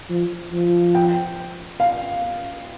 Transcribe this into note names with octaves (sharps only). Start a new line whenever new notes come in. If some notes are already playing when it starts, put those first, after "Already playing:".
F3
F3
G5
F5